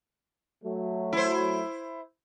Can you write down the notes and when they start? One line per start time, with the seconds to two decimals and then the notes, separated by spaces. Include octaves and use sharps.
0.63 F#3 A3
1.13 E4 C5